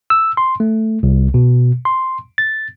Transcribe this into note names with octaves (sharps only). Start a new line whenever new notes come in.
E6
C6
A3
C2
B2
C6
A6